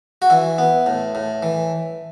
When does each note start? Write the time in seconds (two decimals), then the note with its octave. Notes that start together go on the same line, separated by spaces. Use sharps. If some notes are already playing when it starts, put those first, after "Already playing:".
0.22 F#4
0.30 E3 E4
0.58 B3
0.86 A2
1.15 A2
1.43 E3